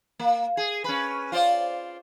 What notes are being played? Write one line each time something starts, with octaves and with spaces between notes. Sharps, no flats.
A#3
G#4
C#4 B4
F4 C5 D5